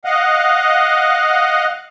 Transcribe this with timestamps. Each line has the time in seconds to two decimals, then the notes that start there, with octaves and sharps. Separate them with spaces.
0.05 D#5 F5 F#5